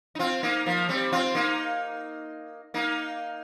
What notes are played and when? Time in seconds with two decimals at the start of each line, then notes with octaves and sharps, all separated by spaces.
0.15 D#4
0.19 C4 F4
0.43 A#3 D#4
0.66 F3 A#3
0.89 G3 C4
1.12 C4 F4
1.35 A#3 D#4
2.74 A#3 D#4